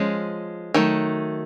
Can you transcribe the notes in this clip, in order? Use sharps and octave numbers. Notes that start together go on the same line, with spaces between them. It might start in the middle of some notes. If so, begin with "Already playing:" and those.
Already playing: F3 G#3 C#4
D#3 F#3 A3